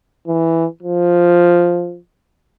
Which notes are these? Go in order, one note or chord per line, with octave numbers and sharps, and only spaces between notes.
E3
F3